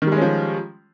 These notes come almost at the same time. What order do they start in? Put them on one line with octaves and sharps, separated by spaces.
D#3 G3 G#3 C#4 F3